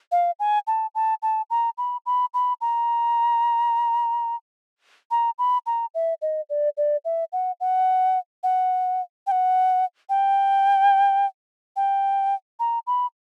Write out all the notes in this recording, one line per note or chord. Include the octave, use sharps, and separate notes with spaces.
F5
G#5
A5
A5
A5
A#5
B5
B5
B5
A#5
A#5
B5
A#5
E5
D#5
D5
D5
E5
F#5
F#5
F#5
G5
F#5
G5
G5
A#5
B5